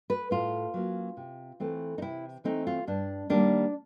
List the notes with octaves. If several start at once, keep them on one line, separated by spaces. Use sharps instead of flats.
B4
A2 F4
F#3 A#3 C#4
C3
E3 A3 C4
D#4
C3 E4
E3 A3 C4 D#4
F4
G2 D4
D#3 G3 A#3 D4